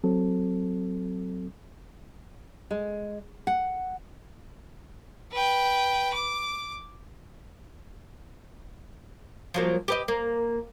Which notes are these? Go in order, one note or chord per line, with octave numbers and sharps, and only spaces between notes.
F#3 C4 A4
G#3
F#5
B4 G5
D6
F3 F#3 A#3
G4 B4 D#5
A#3